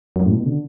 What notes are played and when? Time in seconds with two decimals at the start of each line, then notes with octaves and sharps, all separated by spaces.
0.16 F#2
0.26 A2
0.36 B2
0.46 D3